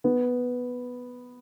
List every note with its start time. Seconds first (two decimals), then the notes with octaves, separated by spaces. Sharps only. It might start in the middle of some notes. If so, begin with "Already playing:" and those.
0.04 B3